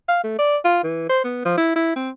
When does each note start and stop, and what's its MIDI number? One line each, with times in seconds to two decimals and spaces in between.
0.08 0.20 77
0.24 0.36 57
0.38 0.57 74
0.65 0.82 65
0.83 1.07 52
1.09 1.20 72
1.24 1.40 59
1.45 1.53 53
1.57 1.72 64
1.76 1.95 64
1.96 2.10 60